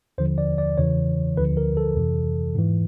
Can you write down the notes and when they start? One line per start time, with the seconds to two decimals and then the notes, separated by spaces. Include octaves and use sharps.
0.18 D#2 D3 F3 C5
0.38 D5
0.58 D5
0.78 E2 C#3 E3 C#5
1.37 D2 D3 F3 B4
1.57 A#4
1.77 A4
1.96 F2 C3 E3
2.55 G#2 E3